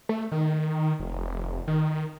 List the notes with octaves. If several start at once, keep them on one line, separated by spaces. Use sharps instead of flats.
A3
D#3
F1
D#3